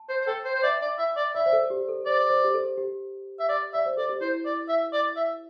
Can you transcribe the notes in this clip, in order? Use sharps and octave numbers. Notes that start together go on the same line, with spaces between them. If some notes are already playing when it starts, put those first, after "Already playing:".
Already playing: A5
C5
C5
A4 G5
C5
C5
D5 E5
D5
E5
D5
D5 E5
C5
A4
G4
A4
C5 D5
C5
G4
A4
G4
E5
D5
D5 E5
C5
A4 D5
G4
E4 C5
D5
E5
D5
E5